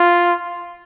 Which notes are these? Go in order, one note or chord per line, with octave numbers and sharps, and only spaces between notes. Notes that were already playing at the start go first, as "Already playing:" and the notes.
Already playing: F4